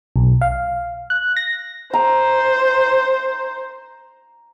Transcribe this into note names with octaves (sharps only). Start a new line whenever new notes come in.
B1
F5
F#6
A#6
C5 A#5